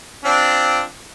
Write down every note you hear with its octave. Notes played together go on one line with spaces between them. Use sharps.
C4 D4 F4